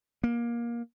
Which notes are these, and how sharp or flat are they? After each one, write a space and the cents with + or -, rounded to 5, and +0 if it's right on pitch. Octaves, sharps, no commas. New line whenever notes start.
A#3 +20